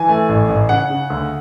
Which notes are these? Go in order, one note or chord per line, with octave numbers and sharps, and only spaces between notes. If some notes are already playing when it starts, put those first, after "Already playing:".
Already playing: E3 G#5
A3
A1
A1
C#3 F#5
C#3
D2